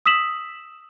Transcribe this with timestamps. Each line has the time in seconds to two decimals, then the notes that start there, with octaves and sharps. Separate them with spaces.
0.06 D#6 E6 B6 E7 F#7